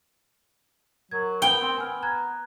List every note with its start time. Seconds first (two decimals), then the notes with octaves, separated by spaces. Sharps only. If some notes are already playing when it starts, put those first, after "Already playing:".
1.11 F#3 A#4 G#6
1.42 B3 G5
1.62 C4
1.78 B3 G#5 F6
2.03 A#5 F#6 G#6